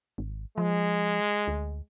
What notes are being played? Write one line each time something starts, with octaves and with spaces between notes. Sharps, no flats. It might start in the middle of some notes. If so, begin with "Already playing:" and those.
G#1
F3 G#3
D2